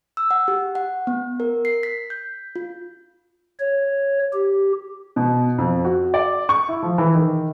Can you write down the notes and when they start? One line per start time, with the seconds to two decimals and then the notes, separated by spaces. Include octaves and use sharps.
0.17 E6
0.31 F#5
0.48 G4
0.75 F#5
1.07 B3
1.40 A#4
1.65 C7
1.83 B6
2.10 G6
2.56 F4
3.60 C#5
4.33 G4
5.16 B2
5.58 F2
5.85 F#4
6.14 D5
6.49 C#6
6.69 E4
6.83 F3
6.98 E3
7.15 D#3